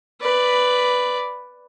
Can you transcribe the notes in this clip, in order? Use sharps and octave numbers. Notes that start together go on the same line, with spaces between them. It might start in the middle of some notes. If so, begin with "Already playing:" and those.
B4 D5